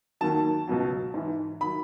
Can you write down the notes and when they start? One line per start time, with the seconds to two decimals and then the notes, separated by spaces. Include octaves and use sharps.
0.21 D#2 D#3 F#3 A5
0.68 C#2 B2 F#3
1.14 G#2 E3
1.61 D#3 F#3 B5